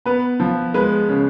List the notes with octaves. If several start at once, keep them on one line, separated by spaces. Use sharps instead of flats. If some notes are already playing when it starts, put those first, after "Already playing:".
B3 B4
F3
G#3 B4
C#3